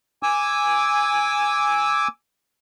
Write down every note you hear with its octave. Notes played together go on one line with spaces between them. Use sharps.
G#5 D6 E6